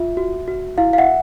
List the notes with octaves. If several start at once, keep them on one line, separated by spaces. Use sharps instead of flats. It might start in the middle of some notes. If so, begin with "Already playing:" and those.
Already playing: F4 E5
F#4
F#4
E4 F5
F5
E5 F#5